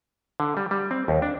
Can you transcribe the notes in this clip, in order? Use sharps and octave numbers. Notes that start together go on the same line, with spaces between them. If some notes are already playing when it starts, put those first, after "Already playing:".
D3
G3
G3
C4
D#2
D4